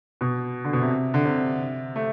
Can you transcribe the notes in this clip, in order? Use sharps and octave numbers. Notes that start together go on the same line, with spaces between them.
B2
D3
B2
C3
D3
C3
A3